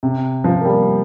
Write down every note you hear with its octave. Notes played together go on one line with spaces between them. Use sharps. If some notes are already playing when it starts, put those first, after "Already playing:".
C3
F3
A#3
G3